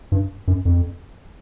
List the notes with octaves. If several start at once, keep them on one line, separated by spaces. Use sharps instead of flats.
G2
F#2
F2